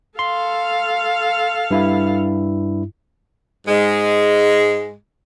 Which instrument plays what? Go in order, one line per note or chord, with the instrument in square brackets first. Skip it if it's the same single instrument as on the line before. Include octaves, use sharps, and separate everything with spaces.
[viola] A4 F5 [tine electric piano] C6
[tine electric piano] G2 E4
[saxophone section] G#2 G#3